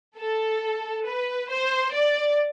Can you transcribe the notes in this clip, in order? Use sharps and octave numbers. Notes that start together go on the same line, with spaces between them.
A4
B4
C5
D5